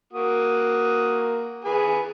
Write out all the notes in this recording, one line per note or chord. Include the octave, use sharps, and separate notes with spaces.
A#3 F#4 D#6
G#4 B4 G#5